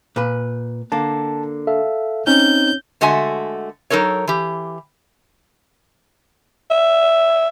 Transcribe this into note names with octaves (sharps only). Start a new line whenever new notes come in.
A#2 B4
D3 A#3 A5
A4 E5 F5
C4 C#4 D#4 G6
D3 G#3 A3 F#4 E5 G#5
F#3 D#4 A4 A#4 C#5
E3 G4
E5